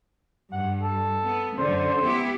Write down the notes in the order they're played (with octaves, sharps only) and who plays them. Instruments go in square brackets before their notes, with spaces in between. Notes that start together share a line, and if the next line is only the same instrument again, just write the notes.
[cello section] G2 [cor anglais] F#5
[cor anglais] A4
[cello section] B3
[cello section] F#2 D3 [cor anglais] C5
[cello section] B3 E4 G4